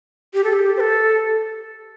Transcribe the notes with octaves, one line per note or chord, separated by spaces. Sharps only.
G4
A4
G4
C5
A4